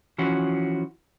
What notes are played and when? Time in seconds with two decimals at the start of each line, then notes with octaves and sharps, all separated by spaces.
0.18 E3 F3 C#4 F#4